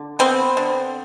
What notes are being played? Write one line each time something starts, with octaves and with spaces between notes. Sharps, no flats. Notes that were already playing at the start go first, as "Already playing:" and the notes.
Already playing: D3
B3 C4
D3